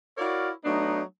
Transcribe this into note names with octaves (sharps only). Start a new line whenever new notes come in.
E4 F#4 A#4 C#5 D5 F5
F#3 A3 B3 D4 D#4